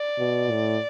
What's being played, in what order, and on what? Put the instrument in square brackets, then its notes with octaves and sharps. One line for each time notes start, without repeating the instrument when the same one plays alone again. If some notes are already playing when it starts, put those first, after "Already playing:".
Already playing: [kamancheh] D5
[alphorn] B2
A2